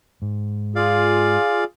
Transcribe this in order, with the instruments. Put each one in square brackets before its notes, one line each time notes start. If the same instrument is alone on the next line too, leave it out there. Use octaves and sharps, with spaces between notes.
[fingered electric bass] G#2
[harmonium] F4 G#4 [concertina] D5 F5